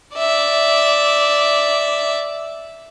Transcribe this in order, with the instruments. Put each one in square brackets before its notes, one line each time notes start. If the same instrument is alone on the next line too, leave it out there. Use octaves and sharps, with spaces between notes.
[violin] D5 E5